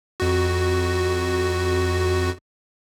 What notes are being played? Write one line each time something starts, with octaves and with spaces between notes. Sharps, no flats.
F2 F#4